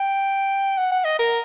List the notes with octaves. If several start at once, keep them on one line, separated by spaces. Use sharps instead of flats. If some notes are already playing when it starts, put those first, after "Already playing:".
Already playing: G5
F#5
F#5
D#5
A#4